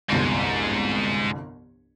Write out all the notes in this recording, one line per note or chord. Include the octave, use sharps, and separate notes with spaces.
G1 C2 F2 G#2